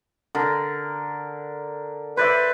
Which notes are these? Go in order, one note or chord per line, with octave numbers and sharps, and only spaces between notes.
D3 A#4
B4 C5 D5 E5